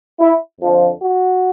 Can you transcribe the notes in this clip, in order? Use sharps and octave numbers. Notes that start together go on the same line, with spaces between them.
E4
F2 D3 F3
F#4